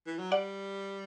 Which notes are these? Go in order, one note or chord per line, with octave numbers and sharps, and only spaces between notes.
E3
F#3
G3 D5 F#5